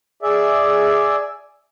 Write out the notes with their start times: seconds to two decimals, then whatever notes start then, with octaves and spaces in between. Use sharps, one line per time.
0.22 G#4 D5 E5